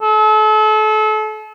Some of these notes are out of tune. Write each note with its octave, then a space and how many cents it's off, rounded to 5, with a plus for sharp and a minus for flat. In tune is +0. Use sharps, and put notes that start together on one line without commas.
A4 -35